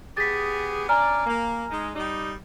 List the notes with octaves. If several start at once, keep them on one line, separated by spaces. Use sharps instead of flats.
B3 G4 G#4 A6 B6
C#4 D4 D5 G#5 A#5 F6
A#3
G#3 D#4
G3 D#4